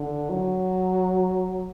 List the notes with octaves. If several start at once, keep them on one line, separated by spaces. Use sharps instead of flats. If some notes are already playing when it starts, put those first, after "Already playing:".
Already playing: D3
F#3